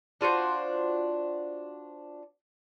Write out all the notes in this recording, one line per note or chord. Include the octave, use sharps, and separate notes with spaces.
D4 F4 F#4 C5